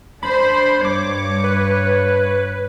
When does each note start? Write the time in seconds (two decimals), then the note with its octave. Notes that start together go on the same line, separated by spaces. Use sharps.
0.23 D4 C5 B5
0.85 G2 C#5 D6
1.44 B4